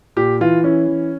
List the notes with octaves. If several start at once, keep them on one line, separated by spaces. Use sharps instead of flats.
A#2 G4
E3 F4
C#4 E4
E3